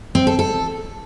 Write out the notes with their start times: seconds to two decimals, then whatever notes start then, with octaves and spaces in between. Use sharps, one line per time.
0.15 C4
0.27 A4
0.39 A4